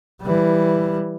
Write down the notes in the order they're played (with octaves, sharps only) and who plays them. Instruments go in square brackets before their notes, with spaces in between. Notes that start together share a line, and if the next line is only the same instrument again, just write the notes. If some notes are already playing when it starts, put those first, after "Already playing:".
[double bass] E3 G3